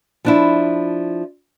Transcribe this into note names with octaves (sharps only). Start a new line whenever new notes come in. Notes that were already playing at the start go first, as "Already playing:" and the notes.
F3 D4 E4